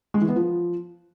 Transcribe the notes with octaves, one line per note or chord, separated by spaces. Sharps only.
G#3
E3
B3
F3